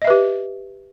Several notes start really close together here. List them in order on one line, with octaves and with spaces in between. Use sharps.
D#5 E5 B4 G4